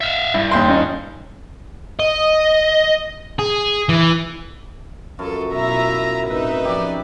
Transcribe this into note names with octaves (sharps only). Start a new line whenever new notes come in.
E5 F5
G2 E4
D#2 G5 C6
C#4 D#4
D#5
G#4
E3
F#2 F4 A4
B2 E4 F4 E5 A#5
A2 C4 D#4 B4 E5
F3 C#4 G4 D5